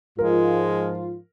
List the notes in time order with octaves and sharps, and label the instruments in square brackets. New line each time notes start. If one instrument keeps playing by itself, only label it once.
[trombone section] G#2 F3 [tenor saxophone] G#3 [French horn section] F4 [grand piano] A#4